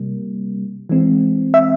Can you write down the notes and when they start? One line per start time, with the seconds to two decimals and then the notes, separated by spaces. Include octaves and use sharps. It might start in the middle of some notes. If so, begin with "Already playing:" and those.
Already playing: C3 G3 A#3
0.89 E3 G#3 C4
1.54 E5